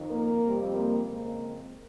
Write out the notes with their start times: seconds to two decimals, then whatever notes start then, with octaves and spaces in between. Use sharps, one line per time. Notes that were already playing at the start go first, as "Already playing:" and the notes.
Already playing: F2 D#3
0.10 A#3 A#4
0.43 F2 C3 G3 C4
0.75 A#3 A#4
1.08 F2 C#3 G#3 A#3 C4 A#4